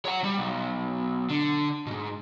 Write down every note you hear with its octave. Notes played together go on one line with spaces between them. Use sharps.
C#5 F#5
G3
B1
D3
G#2 B2